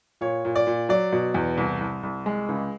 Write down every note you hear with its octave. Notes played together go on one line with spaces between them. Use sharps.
A#2 C#5
A#2
D5
A#2
F#3 D5
B2
E2
C2
C2
C2
G#3
C#2